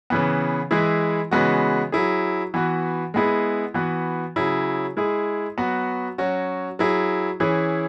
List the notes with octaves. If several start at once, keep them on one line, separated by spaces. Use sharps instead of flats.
C#3 E3 B3
E3 G#3 E4 G#4
C#3 E3 G#3 B3 F#4
F#3 E4 G#4
E3 B3 F#4
G#3 B3 E4 G#4
E3 B3 F#4
C#3 F#3 E4 G#4
G#3 E4 G#4
F#3 B3 F#4
F#3 C#4 F#4
F#3 E4 G#4
E3 C#4 E4 G#4